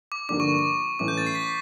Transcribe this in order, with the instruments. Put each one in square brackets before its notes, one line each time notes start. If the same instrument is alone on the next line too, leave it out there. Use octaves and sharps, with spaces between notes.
[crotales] D6
[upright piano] G2 D3 F3 A#3 D4 [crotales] D6
[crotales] C#6
C#6
[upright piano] A2 E3 A3 C#4 [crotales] D6
[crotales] G6
A6
C7
B6